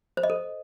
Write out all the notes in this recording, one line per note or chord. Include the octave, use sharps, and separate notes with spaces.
C5
D#5
A4